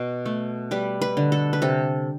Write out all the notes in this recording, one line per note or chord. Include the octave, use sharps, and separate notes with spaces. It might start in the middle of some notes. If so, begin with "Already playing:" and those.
Already playing: B2
A3
G3 B4
B4
D3
A4
B4
C3 A4